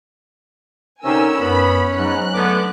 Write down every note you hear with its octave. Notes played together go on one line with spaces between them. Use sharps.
D2 C3 C#4 D#4 A#4 G#5 E6
F#2 B3 B5
G#2 F#3 F#6
D3 A3 B3 D6